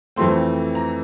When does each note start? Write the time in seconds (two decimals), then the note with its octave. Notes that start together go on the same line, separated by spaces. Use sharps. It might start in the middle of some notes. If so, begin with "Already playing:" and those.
0.16 F2 E3 A3 C4 C6
0.75 A#5